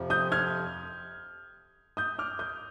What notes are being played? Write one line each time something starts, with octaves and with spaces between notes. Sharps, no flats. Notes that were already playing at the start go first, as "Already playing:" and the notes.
Already playing: F2 C3 F3
D#6 G6
F6 G#6
D#6 G6
D6 F6
D#6 G6